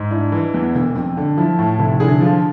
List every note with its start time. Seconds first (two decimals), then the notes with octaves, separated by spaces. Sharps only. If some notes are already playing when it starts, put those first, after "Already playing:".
Already playing: G#2
0.11 D4 E4
0.32 E3
0.54 E2
0.75 E1
0.95 F2
1.17 D3
1.38 F3 E4
1.58 A2
1.79 F1 E4
2.00 D3 E4 G#4
2.21 F3 F4